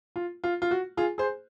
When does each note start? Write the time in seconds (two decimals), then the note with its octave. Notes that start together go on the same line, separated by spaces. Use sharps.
0.16 F4
0.44 F4
0.62 F4
0.71 F#4
0.97 F4 G#4
1.18 G#4 C5